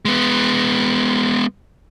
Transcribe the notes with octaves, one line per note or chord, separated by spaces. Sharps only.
G#3 B3